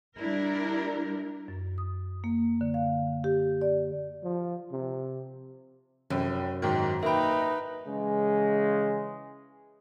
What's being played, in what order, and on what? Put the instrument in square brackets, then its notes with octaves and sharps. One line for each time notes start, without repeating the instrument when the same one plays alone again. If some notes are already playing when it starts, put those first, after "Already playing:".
[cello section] G3 D4 E4 A#4
[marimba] F#2
D#6
A#3
D3
F5
G4
D5
[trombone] F3
C3
[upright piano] F1 [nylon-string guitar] F#2
[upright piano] G#2 B2 D#3
[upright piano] A#3 G5 [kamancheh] D#4 B4 [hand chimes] E5 B5
[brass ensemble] C#3 E3 G#3